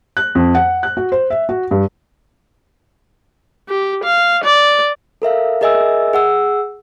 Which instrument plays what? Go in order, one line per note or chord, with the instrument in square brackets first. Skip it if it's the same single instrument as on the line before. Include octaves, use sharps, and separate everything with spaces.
[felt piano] F#6
F2
F#5
F#6
F#4
C5
E5
F#4
G2
[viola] G4
F5
D5
[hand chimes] A4 A#4 E5 F5
G#4 A#4 D#5 E5 G#5 E6
G#4 F#5 E6